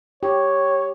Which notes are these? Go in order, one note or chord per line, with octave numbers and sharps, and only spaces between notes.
G4 C#5